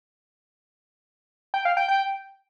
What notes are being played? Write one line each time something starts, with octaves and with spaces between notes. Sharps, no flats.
G5
F5
G5
G5